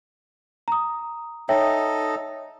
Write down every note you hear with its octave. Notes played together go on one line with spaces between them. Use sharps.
A#5 D#6
D#4 A4 C#5 D#5 E5 G5